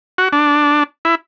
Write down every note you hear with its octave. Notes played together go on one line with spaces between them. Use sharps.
F#4
D4
E4